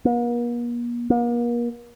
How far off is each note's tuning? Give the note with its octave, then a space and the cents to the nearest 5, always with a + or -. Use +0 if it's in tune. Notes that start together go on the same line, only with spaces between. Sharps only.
A#3 +45
A#3 +40